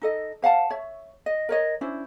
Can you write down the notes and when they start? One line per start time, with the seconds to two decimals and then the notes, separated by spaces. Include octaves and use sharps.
0.02 D#4 A4 D#5
0.42 C5 F5 F#5 A5
0.70 C#5 E5
1.26 D#5
1.49 A#4 C#5 D#5
1.81 C#4 D4 E4 C5